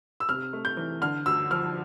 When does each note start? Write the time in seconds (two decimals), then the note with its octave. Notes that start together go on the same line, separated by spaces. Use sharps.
0.20 E6
0.29 C3 F6
0.53 A3
0.65 G6
0.77 E3
1.01 D3 F6
1.26 D2 E6
1.51 F3 F6